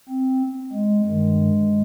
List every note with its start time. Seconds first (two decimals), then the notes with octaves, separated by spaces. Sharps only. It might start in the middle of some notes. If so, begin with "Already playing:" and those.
0.09 C4
0.73 G#3
1.05 G2 D#3 G#3